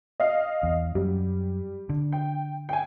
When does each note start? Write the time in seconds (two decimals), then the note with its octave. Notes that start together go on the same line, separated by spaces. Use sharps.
0.20 D#5 F5
0.63 E2
0.95 F#2 G3
1.89 D3
2.12 G5
2.69 G5 G#5